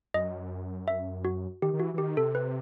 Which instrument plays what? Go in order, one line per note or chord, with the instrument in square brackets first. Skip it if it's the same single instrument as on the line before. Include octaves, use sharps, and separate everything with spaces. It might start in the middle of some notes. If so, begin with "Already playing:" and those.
[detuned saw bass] F#2 [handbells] D#5
[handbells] E5
F#4
[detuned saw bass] D#3 [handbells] G4
[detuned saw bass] D#3
[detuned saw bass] E3 [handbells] F#4
[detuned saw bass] E3
[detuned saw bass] D#3 [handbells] G4
[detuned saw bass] C3 [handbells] A4
[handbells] B4